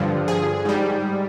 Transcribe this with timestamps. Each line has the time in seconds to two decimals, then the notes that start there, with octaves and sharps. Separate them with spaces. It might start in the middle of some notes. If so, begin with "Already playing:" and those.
Already playing: G2 D3 F3
0.28 G#4
0.65 G#2 G3